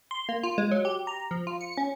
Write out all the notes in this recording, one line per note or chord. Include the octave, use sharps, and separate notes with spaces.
C6
A#3
F4
G#3
F#3
G4
A#5
F3
F4
C#7
C#4